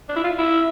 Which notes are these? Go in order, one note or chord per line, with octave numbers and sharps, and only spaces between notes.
D4
E4
F4
E4